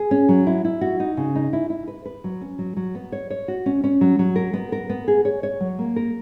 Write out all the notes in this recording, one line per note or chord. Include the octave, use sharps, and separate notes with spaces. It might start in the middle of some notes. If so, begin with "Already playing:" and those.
Already playing: G#4
C#4
F#3
E4
E4
F#4
D#4
C#3
D#4
E4
E4
B4
B4
F#3
C#4
F#3
F#3
B3
C#5
C#5
F#4
C#4
C#4
F#3
F#3
A#4
B3
A#4
B3
G#4
C#5
C#5
F#3
A#3
A#4